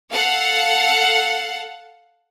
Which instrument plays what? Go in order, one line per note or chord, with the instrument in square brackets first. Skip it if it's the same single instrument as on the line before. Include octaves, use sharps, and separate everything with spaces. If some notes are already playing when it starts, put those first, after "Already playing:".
[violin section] A4 F5 F#5